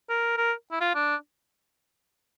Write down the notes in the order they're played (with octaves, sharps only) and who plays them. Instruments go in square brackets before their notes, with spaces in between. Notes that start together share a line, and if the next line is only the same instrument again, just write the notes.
[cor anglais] A#4
A#4
E4
F4
D4